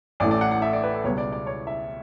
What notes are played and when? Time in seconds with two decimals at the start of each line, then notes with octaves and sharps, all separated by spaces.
0.20 A1 A2 E3 A3 D5
0.31 D5
0.41 F#5
0.51 F#5
0.62 E5
0.73 D5
0.83 B4
0.94 A4
1.04 C#2 B2 G3 B3 C#5
1.18 D5
1.32 D5
1.47 C#5
1.67 E5